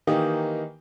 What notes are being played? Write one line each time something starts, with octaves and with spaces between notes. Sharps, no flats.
D#3 E3 A#3 D#4 G4